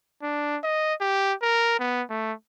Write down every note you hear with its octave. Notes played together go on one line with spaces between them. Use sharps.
D4
D#5
G4
A#4
B3
A3